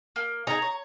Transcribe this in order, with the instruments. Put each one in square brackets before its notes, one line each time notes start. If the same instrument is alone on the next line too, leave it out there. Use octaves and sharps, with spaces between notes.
[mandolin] A#3
[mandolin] D#4 G#4 [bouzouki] A#5
[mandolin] C#5